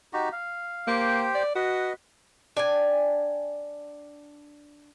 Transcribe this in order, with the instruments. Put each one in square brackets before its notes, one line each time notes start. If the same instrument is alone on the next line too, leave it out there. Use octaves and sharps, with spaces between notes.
[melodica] D#4 F#4 G4
F5
[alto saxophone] A#3 [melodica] G4 C5 G5
[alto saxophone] D5
[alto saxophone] F#4 [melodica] B4 D#5
[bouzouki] D4 G5 G#5